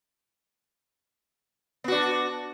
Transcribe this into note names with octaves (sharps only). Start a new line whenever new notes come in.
B3 D4 F#4